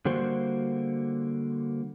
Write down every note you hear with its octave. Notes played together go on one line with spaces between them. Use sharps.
D3 G3 A#3 F#4 C5